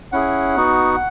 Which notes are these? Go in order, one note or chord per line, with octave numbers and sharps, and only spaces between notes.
C#4 E4 G#4 F#5
B3 D#4 F#4